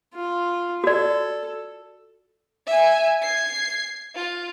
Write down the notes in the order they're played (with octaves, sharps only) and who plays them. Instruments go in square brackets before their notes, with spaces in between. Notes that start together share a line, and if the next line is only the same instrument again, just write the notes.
[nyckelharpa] F4
[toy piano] F#4 D5 [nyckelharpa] A4
[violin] E5 G#5
G#6 C7
F4